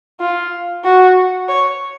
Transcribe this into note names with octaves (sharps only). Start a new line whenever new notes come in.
F4
F#4
C#5